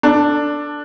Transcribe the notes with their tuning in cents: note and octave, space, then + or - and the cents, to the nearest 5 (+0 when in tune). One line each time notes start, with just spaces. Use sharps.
D4 +0 A4 +15